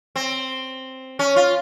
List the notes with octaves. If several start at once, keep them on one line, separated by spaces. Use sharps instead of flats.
C4
C#4
F4